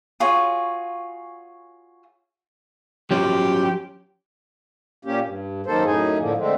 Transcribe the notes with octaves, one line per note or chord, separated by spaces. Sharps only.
F4 F#4 G#4 C#5
F3 F#3 C#4 G4
A#2 A#3 C#4 G4
G2
F#2 D#3 A#3 A4 C5
F#2 A2 D#4 G#4
A2 D3 F3 A#3
D3 G#3 A3 C4